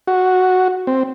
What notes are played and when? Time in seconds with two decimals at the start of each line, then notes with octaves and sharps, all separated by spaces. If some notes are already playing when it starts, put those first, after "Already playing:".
0.07 F#4
0.87 C4